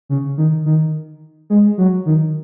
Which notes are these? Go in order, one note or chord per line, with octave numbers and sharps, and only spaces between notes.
C#3
D#3
D#3
G#3
F#3
D#3